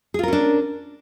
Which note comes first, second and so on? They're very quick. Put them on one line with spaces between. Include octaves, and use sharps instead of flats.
G#4 F4 A#4 C#4 D4